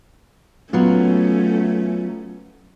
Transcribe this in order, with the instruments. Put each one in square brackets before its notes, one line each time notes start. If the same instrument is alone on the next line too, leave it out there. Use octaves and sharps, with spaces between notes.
[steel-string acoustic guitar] F#3 B3 F4 [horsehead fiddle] A3 C#4